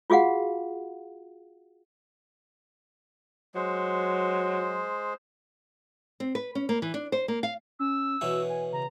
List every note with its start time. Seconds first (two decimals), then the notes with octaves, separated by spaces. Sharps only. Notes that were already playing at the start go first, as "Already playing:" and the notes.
0.10 F4 F#4 G#4 F5 F#5
3.55 F#3 G#3 C5
6.20 C4
6.35 B4
6.55 C#4
6.69 A#3
6.82 E3
6.94 D4
7.12 C5
7.28 A#3
7.43 F5
7.79 C#4 E6
8.21 B2 E3 C#4 F#4
8.49 G#5
8.73 C#3 A#5